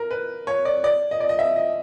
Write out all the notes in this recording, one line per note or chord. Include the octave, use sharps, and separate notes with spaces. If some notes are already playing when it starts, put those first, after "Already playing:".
Already playing: A#4
B4
C#5
D5
D5
D#5
D5
D#5
E5
D#5